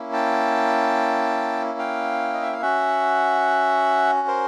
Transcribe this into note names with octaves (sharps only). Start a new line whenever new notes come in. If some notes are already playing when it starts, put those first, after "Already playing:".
Already playing: A#3 C#4 E4
G5 A5
F5 G5
D#5
E5
F5
C#4 F#4 E5 F#5
A#4 C5